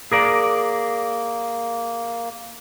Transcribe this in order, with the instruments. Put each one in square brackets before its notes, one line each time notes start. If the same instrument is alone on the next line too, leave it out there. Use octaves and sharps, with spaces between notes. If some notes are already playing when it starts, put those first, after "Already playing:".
[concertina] A#3 [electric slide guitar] G#4 A#4 D5